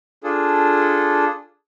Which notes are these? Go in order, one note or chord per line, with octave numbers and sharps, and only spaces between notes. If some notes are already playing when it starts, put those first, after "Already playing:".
D4 F4 G#4 A4